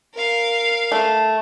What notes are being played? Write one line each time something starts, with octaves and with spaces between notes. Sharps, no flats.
A#4 F5
A3